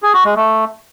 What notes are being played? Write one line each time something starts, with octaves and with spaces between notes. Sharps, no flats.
G#4
F#4
G#3
A3